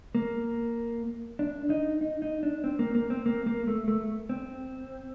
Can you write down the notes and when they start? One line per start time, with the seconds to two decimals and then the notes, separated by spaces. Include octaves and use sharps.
0.15 A#3
1.39 D4
1.70 D#4
2.01 D#4
2.22 D#4
2.43 D4
2.64 C4
2.79 A#3
2.95 A#3
3.10 C4
3.26 A#3
3.47 A#3
3.68 A3
3.88 A3
4.29 C4